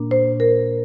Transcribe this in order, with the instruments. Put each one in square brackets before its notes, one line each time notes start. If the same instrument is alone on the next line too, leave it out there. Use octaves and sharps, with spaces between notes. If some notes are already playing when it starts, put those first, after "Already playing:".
Already playing: [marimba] A#2 A#3 D4
C5
A#4